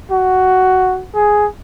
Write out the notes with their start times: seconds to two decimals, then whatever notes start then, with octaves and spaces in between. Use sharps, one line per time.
0.11 F#4
1.14 G#4